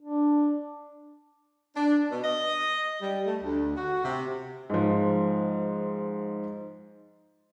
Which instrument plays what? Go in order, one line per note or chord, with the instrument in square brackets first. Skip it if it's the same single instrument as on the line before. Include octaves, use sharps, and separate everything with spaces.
[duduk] D4
[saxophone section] D4
B2
D#5
G3
A3
D2
F#4
C3
[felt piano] G#2 F3